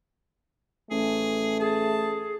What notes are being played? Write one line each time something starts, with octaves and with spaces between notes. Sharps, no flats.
A1 A3 G#4
G#4 A5